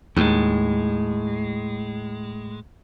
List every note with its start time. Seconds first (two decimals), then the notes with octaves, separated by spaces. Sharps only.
0.16 D#2 A2 G#3